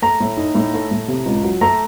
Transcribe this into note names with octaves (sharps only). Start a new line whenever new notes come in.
A3 A#5
A2
D#4
A2
A3
A2
C3
C#2
F#3
A3 A#5